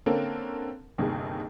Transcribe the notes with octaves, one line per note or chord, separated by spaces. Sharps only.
D3 A#3 C4 C#4 A4 A#4
G1 D#2 C3 D#3 G#4